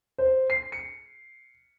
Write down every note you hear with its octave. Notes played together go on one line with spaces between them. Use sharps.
C5
C7
C#7